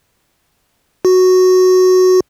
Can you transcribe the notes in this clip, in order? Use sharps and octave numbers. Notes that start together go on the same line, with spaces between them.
F#4